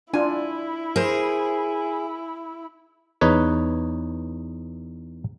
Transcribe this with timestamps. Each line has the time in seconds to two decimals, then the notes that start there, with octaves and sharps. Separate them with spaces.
0.13 D4 E4 F4 G#5
0.96 G#4 A#4 C5
3.21 E2 D#4 B4 C#5